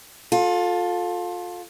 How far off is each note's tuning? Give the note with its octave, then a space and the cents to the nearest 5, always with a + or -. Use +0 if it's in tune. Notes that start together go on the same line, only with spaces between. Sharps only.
F4 +25 A4 -5